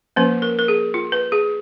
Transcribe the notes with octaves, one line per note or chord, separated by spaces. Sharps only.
F3 A#3 C#4 B4
A#4
A#4
G#4
F4
B4
G#4